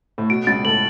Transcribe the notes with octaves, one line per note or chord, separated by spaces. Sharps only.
A2
B2 D7
C#2 C#3 A6
A2 A3 F#7